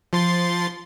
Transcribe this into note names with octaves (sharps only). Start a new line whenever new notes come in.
F3 C6 A6